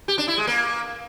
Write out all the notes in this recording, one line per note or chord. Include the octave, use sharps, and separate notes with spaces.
G4
D4
E4
G#3
A#3